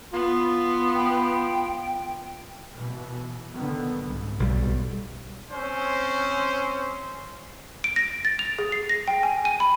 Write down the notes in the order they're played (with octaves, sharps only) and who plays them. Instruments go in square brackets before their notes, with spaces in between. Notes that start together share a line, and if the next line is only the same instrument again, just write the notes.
[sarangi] B3 [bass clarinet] F4
[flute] G5
[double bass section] B2 E3
D3 D#3 B3
C2 G#2
[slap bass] B1 B2 G3
[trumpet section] C4 C#4 C5
[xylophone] D7
A#6
A6
F7
G#4
C7
A#6
G5
G#5
D#7
B5